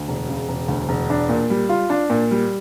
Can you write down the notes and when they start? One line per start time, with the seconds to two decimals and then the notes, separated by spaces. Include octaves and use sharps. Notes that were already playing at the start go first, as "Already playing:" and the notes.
Already playing: D2
0.08 E1
0.29 C#3
0.49 E1
0.68 D2
0.89 E1
1.10 D4
1.29 A#2
1.50 G3
1.69 F4
1.90 D4
2.10 A#2
2.31 G3